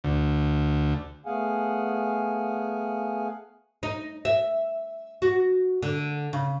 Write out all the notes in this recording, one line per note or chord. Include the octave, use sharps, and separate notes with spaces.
D2
A3 B3 G#4 F5 F#5 G#5
D#4
E5
F#4
D3
C#3